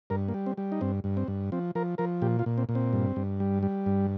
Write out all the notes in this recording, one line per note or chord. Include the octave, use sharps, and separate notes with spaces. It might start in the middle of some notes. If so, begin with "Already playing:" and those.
G2 A#4
A#3
G3
C4
G3
D#4
G2 C4
G2
C4
G2
F3 C4
F3 A#4
F3 A#4
A#2 G4
F4
A#2
C4
A#2
C4
G2
G2
G3
G3
G2